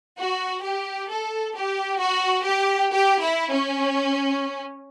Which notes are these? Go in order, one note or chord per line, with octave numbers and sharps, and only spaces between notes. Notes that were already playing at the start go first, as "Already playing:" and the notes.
F#4
G4
A4
G4
F#4
G4
G4
E4
C#4